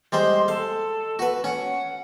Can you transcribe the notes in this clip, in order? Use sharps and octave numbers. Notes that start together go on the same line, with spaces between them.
G3 G#3 C5 C6
A4 F5
F#4 B4
C#4 F#5